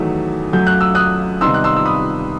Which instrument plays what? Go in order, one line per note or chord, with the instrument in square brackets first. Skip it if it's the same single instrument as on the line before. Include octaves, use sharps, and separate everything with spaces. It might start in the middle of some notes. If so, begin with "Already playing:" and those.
Already playing: [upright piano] E2 D#3 F#3 A3
F#2 F#3 A3 G6
F#6
E6
D#6 F#6
C3 D#3 G3 B3 D#4 C6 E6
F#6
C6 E6
E6
B5 D#6